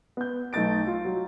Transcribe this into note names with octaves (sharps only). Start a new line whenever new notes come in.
B3 G6
B1 A3 D#4 A6 D7
F4
F#3